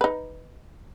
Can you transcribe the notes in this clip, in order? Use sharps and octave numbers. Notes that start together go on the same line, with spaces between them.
D#4 B4